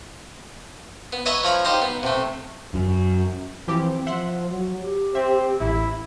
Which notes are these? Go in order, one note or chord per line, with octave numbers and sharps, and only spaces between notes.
B3
B4 C#5 D#5 E5 A5 A#5
F3 C#5 A#5 B5 C#6
D#4 G4 C5 F5 A#5 C6
B3
C3 A3
F#2
E3 F3 C4 G4
F3 E5 F#5 C6
F#3
G4
C4 E5
A1 E4